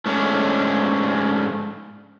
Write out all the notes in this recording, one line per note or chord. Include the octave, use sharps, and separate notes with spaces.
G#2 A3 C#4 D4